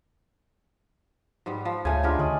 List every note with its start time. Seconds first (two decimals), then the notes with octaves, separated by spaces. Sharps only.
1.46 G#2 G3 B3
1.65 F3
1.85 D2 C#3 A3 G#5
2.03 G#3 B3 D4 D#4 F4 G4
2.19 D3 C#4 D5 D#5